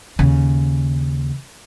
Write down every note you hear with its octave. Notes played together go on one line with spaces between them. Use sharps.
D#2 C#3